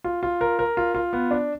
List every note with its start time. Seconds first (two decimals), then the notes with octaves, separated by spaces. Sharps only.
0.04 F4
0.23 F4
0.41 A#4
0.59 A#4
0.77 F4
0.95 F4
1.13 B3
1.31 D4